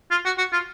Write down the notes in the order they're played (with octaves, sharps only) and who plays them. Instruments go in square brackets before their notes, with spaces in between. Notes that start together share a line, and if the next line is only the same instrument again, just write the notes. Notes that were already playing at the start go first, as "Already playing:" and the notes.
[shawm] F4
F#4
F#4
F4